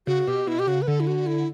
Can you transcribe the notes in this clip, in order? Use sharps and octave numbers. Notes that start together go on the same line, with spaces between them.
C#3 F#4
B2 G4
B2 E4
G4
C#3 F#4
B4
D3 A4
E4
F#4
E4